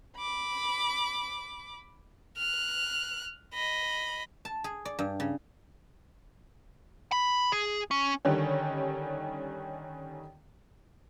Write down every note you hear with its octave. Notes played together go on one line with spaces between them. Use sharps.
B5 D6
F6 F#6
D#5 B5
A5
G#4
D5
G2
C#3
B5
G#4
C#4
D3 D#3 G3 C#4